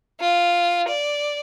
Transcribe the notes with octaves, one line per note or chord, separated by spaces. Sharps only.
F4
D5